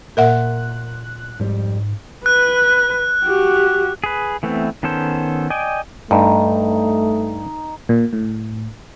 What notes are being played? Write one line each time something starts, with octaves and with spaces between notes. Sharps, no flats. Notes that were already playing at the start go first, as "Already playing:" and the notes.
A#2 A#4 E5 F#5 F#6
F2 G#2 G3
B4 F#6
F#4 G4
G#4 B4
E3 A3 B3 C4
D#3 B3 C#4 A4 C5
D5 D#5 G5 G#5
G2 A3 D#4
A#2
A2